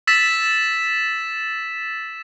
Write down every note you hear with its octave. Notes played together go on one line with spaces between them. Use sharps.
E6 A6 B6 E7